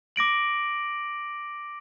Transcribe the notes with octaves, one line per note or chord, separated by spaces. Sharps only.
D6 A#6 D7 F#7